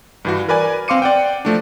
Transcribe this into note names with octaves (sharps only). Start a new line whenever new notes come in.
G2 E3 F#4
A#4 B4 D5 G#5
C4 F5 C6 D6 C#7 D#7
D5 F#5 G5
F3 A3 D4